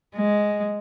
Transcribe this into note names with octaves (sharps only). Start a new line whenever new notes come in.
G#3